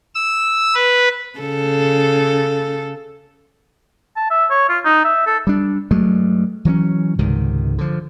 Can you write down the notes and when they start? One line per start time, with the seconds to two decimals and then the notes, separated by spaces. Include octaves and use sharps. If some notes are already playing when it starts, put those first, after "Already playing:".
0.15 E6
0.75 B4
1.39 C#3 A4
4.16 A5
4.30 E5
4.50 C#5
4.69 F4
4.85 D#4
5.04 E5
5.26 A4
5.47 G3 D4
5.91 G2 F#3 G#3 A3
6.65 E3 F#3 G#3 C#4
7.19 C#2 G#2 C3 D#3
7.78 D3 F3